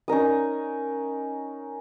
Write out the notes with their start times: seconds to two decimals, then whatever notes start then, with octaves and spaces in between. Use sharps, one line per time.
0.08 C#4 D#4 A#4 D#6